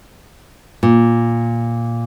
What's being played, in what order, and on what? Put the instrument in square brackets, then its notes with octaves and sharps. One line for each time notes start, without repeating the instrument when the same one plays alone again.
[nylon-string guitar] A#2